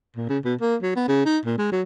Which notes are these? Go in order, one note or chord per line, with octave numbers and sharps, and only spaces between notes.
A#2
C#3
B2
A#3
F#3
B3
C#3
D#4
A#2
G#3
F#3